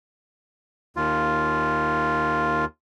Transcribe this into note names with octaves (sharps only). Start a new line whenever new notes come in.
D#2 F4